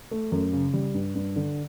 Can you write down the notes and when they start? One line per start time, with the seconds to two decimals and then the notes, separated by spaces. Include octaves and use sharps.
0.11 A3
0.32 F#2
0.53 C#3
0.74 G3
0.94 G2
1.15 G2
1.36 D3